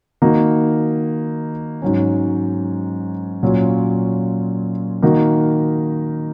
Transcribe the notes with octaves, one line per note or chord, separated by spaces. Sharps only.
D#3 A#3 D#4 F#4
G#2 F#3 C#4
A#2 F#3 C#4 F4
D#3 A#3 D#4 F#4